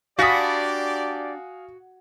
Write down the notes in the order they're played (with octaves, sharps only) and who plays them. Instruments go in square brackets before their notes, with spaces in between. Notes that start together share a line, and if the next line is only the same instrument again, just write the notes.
[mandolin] D4 B5 [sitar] F#4 [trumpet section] G4 D5 [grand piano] F5 G#5 D#6